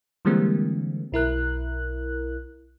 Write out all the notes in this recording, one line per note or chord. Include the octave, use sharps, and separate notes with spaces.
D3 E3 G3 G#3 A#3 C4
B1 E4 A#4 F#6